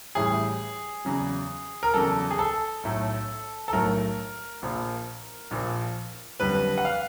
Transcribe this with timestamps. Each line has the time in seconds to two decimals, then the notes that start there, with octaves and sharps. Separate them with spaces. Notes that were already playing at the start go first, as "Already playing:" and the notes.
0.15 A1 A2 E3 G3 G#4
1.05 E2 C#3 F#3
1.83 A#4
1.94 E2 C#3 F#3 A4
2.31 G#4
2.39 A4
2.83 B1 A2 F#3 A3
3.68 A4
3.72 B1 A2 F#3 A3 A#4
4.62 A#1 A#2 F3
5.51 A#1 A#2 F3
6.40 F#1 F2 D3 G3 B4
6.78 F#5
6.85 F5